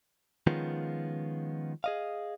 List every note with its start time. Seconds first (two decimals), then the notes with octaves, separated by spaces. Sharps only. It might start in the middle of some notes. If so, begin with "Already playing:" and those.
0.47 D#3 F3 G#3 B3 C#4 F4
1.84 G#4 D#5 F5